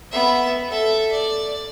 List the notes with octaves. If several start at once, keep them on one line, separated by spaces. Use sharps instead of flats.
B3 E5
A4 E5
D5